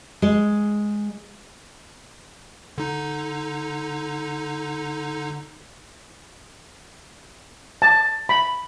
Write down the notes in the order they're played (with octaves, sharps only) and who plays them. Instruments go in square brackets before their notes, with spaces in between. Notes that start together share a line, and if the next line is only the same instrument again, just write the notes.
[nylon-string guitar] G#3
[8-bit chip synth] D3 D#4
[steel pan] A5
B5